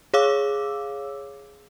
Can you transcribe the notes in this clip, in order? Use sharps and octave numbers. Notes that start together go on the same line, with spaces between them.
G#4 C#5 F5 D6 E6